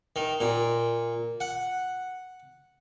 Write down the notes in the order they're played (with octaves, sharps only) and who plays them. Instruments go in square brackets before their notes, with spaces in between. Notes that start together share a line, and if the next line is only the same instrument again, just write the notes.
[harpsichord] D#3
A#2
F#5